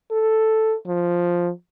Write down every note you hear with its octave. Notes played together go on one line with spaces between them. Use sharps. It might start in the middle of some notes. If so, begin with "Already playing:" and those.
A4
F3